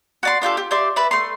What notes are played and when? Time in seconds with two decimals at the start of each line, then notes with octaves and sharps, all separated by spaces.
0.23 F#4 D5 C6
0.42 D4 F4 G4 A4
0.57 G4
0.71 G4 D5 E5 C6
0.96 B4 D5 E5
1.11 A3 C6